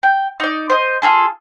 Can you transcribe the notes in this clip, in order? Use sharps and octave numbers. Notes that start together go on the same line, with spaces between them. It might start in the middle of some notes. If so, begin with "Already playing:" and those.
G5
D#4 D5
C5 D#5
F4 F#4 G#4 A4